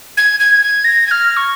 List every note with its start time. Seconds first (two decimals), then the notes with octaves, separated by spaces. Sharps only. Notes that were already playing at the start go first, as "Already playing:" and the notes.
0.17 G#6
0.40 G#6
0.62 G#6
0.84 A#6
1.07 G#6
1.11 F6
1.37 C#6